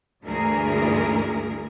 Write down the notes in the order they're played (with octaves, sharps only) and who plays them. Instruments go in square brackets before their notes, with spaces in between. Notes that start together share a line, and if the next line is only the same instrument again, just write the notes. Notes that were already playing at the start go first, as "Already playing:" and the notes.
[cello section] D2 G2 E3 A3 G#4 A#4